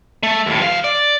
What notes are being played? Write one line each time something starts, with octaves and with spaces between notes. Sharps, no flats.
A3
D#2 A2
E3 F5
D5